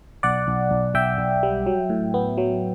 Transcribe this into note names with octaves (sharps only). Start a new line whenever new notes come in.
B1 D5 F#5
B1
B1
B1 E5 G5
B1
G3
F#3
A2
B3
F#3